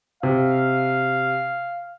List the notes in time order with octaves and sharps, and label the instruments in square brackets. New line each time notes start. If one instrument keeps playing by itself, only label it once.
[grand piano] C3 [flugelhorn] F5